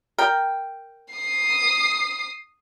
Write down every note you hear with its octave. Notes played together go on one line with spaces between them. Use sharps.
A#4 G5
D#6 C7